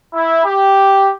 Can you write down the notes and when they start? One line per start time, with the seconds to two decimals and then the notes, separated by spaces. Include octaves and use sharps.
0.14 E4
0.45 G4